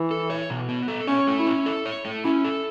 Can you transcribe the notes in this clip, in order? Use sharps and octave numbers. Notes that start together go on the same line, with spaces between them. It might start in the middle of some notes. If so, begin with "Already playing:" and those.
Already playing: E3
A4
C#5
B2
B3
A4
C#4 C#5
A3
E4
C#4
A4
C#5
A3
C#4 E4
A4